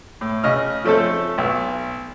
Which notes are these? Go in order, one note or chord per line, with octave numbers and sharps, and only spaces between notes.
A2
C#3 D#5 F6
F3 A3 C4 C#4 A4
B1